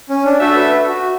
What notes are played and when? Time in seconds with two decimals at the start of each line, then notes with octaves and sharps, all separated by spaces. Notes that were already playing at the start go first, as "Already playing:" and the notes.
0.09 C#4
0.25 D4
0.40 A3 D4 F#4 A4 E5
0.56 B4
0.88 F#4